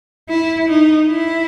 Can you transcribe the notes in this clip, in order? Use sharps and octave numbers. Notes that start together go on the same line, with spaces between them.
E4
D#4
E4